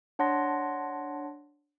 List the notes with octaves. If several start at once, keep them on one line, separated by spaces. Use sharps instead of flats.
D4 C#5 F#5 A5 C6 A#6